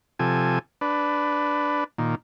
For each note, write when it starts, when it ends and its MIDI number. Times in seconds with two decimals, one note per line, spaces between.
0.19 0.59 48
0.19 0.59 53
0.19 0.59 69
0.19 0.59 80
0.81 1.84 62
0.81 1.84 71
1.98 2.15 46
1.98 2.15 51